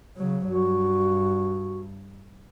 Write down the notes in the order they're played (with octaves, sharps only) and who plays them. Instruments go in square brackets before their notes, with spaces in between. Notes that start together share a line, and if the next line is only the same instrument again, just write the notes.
[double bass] C#3 F#3
[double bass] G2 [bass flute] F#4